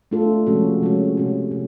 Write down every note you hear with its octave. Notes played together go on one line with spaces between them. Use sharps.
A3 D4 F4 A4
C3 F3 G#3 C#4 F#4
C3 F3 G#3 C#4 F#4
C3 F3 G#3 C#4 F#4
C3